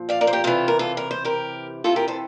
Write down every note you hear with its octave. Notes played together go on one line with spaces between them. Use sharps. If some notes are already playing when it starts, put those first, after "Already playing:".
Already playing: A#2 F3
D5 F5
A#4 D5
C5
G4 A#4
C3 E3 F4 A4
A#4
F4 A4
A#4
C5
G4 A#4
C3 E3 F4 A4
G4 A#4
A4 C5